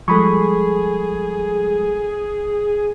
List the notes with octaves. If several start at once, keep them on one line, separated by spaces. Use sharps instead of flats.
F3 G3 G#3 G#4 A4 B5 C#6